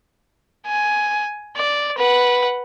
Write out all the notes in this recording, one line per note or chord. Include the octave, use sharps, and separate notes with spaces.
G#5
D5
B4 F#5